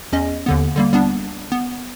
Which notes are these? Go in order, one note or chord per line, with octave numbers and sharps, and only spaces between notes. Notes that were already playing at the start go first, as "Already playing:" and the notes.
E2 C#4 D#5
D#2 D3 B3
D3 G3 A#3
G3 B3 D4
B3